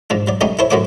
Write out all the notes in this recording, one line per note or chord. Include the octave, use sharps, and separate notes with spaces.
G#2 F3 D4
F#3 D5
F#3 G3 A3 C#4 D#4 G4
E4 A4 C5 C#5
F#2 A2 A3 F#4 C#5 D6